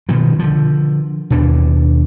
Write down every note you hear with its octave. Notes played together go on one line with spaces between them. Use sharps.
B2 D#3 F3
D3 F3
D#2 B2 D4